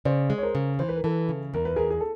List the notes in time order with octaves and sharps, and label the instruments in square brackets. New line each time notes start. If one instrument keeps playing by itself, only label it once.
[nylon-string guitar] C#3 [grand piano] C5 D5
[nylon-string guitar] G#3
[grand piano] C#5
A#4 C5
[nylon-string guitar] C#3
[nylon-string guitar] E3 [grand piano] C5
[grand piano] B4
A#4
[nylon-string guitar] E3 [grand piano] A4 B4
[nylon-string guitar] C#3
[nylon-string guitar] E2 [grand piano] A#4
[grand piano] B4
[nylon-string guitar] E2 [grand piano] G#4 A#4
[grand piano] G#4
A4